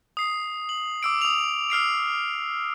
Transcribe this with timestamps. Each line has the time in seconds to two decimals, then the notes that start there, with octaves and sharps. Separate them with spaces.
0.17 D#6 C7
0.69 F#7
1.03 D6 E6 D7
1.22 D#6 F7
1.70 E6 F6 C7 D7